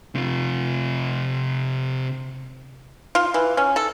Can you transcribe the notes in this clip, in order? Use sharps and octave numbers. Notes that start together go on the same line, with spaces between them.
C3 F4
F4
E3
C#4
A4